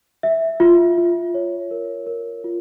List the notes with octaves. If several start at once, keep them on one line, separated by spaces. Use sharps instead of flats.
E5
F4
F4
C#5
A#4
A#4
F4